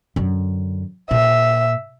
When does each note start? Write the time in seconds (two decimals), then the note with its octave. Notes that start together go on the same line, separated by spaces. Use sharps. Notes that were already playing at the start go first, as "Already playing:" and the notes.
0.16 F#2 D3
1.11 A#2 E5